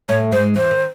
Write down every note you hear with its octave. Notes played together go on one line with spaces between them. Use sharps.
A2 A3 C#5
G#2 G#3 C5
E2 E3 C5
D#3